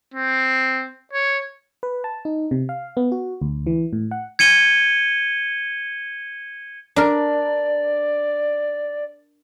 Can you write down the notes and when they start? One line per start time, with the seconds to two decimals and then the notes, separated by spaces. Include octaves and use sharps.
0.14 C4
1.13 C#5
1.83 B4
2.04 A5
2.25 D#4
2.51 C3
2.69 F5
2.97 B3
3.12 F#4
3.42 D2
3.67 E3
3.93 A2
4.11 F#5
4.39 G#6 C#7 D#7 G7
6.96 D4 A#4 D5